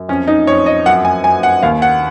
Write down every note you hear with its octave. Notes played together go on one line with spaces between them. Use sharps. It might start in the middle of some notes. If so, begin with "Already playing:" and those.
Already playing: F#2
F2 C#4
D#4
F2 C#5
D#5
F#2 F#5
G#5
F#2 G#5
F#5
D#2 F5
F#5